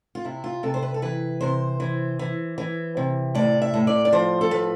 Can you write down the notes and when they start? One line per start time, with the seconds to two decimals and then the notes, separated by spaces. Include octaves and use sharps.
0.15 F4
0.25 C3 E4
0.44 F4
0.63 C3 A4
0.74 C5
0.82 B4
0.94 A4
1.02 E3 B4
1.41 C3 C5
1.80 E3
2.19 E3
2.58 E3
2.97 C3
3.35 A2 D5
3.62 E5
3.74 A2
3.87 D5
4.05 D5
4.12 F3 C5
4.41 A4
4.51 F3 B4